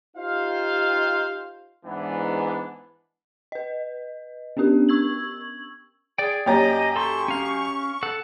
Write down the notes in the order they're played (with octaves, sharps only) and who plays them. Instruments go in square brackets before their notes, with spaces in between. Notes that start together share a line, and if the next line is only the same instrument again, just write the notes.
[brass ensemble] D#4 F4 G4 C5 F5
G#2 E3 B3 D4
[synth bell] B4 D#5
B3 C#4 D4 G4 A#4
C#6 E6 G#6 F#7
[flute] G#4 [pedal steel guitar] D5 G5
[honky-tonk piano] F#2 G4 A#5 [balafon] A#3 C#5 [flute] D#5
[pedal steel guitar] A4 C6 [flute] C#6
[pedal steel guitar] C#4 F5
A4 F#5